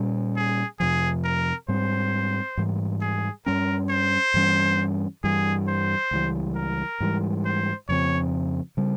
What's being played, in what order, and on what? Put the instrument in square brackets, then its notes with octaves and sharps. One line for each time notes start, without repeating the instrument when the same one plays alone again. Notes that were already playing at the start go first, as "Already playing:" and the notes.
Already playing: [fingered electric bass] A#2 G3 C#4
[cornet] G#4
[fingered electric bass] F2 C3 F3 [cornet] G#4
[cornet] A#4
[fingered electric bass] G#2 G3 C4 [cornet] C5
[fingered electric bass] G#2 E3 G3
[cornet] G#4
[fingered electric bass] G2 G3 C#4 [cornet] A#4
[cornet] C5
[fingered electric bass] G2 E3 G3 C#4
[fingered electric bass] G2 E3 G3 [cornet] G#4
[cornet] C5
[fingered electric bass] C#2 C#3 E3 G3
[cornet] A#4
[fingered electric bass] G#2 E3 G3
[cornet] C5
[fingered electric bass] F2 C#3 F3 C4 [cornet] C#5
[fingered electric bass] C#3 G3